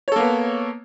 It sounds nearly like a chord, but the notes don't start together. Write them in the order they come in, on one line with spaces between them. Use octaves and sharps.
C#5 A4 A#3 B3